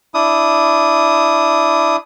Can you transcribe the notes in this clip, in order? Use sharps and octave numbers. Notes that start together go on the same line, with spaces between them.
D4 E4 D#6